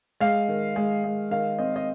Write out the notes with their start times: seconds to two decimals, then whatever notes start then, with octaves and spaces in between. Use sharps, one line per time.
0.20 G#3 F5
0.49 D#3
0.76 G#3
1.04 G#3
1.31 D#3 F5
1.59 C4 D#5
1.76 D#5